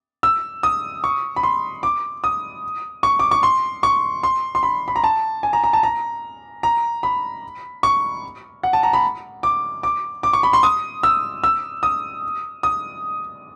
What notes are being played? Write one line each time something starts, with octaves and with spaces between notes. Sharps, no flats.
E6
D#6
C#6
B5
C6
D6
D#6
C#6
D6
C#6
C6
C#6
C6
C6
B5
B5
A#5
A5
G#5
A#5
A#5
A5
A#5
A#5
B5
C#6
F#5
A5
A#5
B5
D6
D6
D6
C#6
B5
C6
D#6
E6
E6
D#6
D#6